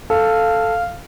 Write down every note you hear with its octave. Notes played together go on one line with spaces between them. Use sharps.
A4 F5